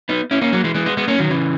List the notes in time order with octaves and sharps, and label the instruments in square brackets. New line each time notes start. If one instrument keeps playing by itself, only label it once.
[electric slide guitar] B3 D#4
C#4 E4
A#3 C#4
F#3 A#3
E3 G#3
E3 G#3
G#3 B3
G#3 B3
A#3 C#4
D#3 F#3
C#3 E3